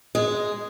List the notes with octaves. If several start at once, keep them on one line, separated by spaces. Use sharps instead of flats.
G#3